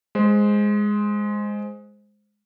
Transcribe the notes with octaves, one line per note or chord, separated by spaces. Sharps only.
G#3 C5